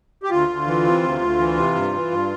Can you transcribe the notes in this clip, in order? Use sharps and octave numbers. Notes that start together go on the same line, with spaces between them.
G4
D2 F4
D2
E3
C3
D2
D2
E3
C3
G2
E3
G2